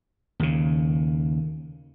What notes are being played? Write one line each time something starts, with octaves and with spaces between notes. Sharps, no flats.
D#2 C#3